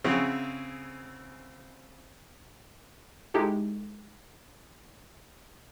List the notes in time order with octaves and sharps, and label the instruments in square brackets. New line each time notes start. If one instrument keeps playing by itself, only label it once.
[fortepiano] C#3 C4 E4 F#4 G#4 C#5
[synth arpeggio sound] G#3 D#4 E4 G4 A4